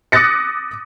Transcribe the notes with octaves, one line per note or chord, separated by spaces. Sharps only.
D6 D#6 F#6 A6 A#6 C#7